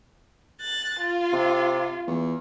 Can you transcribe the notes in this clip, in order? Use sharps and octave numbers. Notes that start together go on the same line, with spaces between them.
F#6 A6
F4
C3
E2